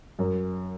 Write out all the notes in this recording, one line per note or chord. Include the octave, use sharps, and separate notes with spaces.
F#2